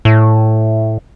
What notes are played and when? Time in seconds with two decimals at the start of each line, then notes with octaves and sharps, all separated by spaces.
0.05 A2